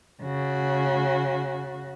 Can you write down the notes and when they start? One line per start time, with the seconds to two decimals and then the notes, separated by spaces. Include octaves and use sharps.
0.22 C#3 F#4